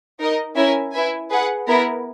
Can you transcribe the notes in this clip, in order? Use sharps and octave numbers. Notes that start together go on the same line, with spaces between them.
D#4 A#4 D#5
C#4 E4 A#4 E5 G#5
E4 B4 E5 G#5
G#4 B4 F#5
B3 E4 A#4